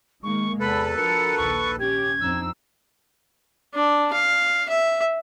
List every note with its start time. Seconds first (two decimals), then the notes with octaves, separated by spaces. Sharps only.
0.23 D#3 G#3 A#3 C#6
0.60 E2 C3 A4 B4 B5
0.97 F3 D4 F#4 A#4 C#7
1.37 A#1 D#2 C#6
1.79 C#4 G4 G#6
2.21 F2 C4 D4 D#4 E6
3.74 D4
4.13 F5
4.69 E5